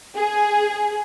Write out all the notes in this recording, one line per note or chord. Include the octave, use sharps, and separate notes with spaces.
G#4